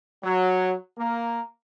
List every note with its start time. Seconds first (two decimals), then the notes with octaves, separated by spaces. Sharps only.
0.22 F#3
0.96 A#3